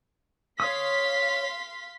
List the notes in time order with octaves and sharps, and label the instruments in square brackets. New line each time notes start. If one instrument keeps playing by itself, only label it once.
[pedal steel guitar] C#5 D#6 [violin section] F5 C6 B6